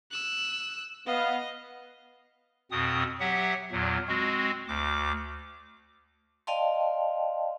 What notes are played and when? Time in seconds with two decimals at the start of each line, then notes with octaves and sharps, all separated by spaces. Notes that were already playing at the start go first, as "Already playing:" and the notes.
0.11 E6 F#6
1.06 B3 D#5 F5
2.71 F2 B2 C4 D#6
3.20 F#3 G4 E5 F#5
3.72 E2 A#2 F#3
4.08 G#3 C4 F#4
4.68 D2 D6
6.47 D5 D#5 F5 G5 A5 C6